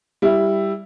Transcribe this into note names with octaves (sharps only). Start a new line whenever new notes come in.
G3 E4